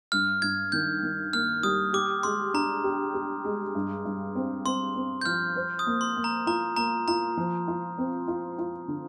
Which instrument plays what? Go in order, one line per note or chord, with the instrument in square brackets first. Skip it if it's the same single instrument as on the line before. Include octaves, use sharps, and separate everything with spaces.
[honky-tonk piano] G2 [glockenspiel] F6
[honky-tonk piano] G2 [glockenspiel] G#6
[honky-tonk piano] D#3 [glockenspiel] G6
[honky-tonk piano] D#3
[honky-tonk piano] A#3 [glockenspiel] F6
[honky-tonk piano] G3 [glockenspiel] D#6
[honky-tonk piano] G4 [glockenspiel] D6
[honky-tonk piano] G#3 [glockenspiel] C6
[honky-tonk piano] D4 [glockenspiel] A#5
[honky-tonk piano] G4
G4
G#3
G2
G2
C4
[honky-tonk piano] C4 [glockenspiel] C6
[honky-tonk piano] C4
[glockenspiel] G6
[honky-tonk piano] F3 [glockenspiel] F6
[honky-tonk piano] C5
[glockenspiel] D#6
[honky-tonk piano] A#3
[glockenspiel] C6
[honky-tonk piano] A#3
[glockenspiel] A#5
[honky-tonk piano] F4 [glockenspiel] A#5
[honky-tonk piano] A#3 [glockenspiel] A#5
[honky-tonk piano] F4 [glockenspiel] A#5
[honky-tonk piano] F3
F4
C4
F4
F4
D3